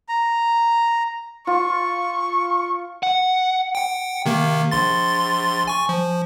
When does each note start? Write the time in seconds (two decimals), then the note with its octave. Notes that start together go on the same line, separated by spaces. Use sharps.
0.09 A#5
1.47 F4 C#6
3.03 F#5
3.75 F#5 G5
4.25 C3 D#3 A#3
4.71 A#1 C6 A6
5.67 G#5 C#6
5.89 F3